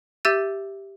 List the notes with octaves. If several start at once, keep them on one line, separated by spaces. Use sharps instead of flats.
G4 E5 E6 G6 A6 D#7